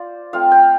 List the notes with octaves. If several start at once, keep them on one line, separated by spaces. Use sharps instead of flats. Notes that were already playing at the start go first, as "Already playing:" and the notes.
Already playing: F4 C5 D5
A3 C4 F4 F5
G5